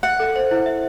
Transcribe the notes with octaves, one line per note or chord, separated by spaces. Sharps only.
E5 F#5
A4
C5
E4
E5